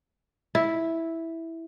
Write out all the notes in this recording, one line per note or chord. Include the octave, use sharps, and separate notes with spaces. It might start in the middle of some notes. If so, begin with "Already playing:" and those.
E4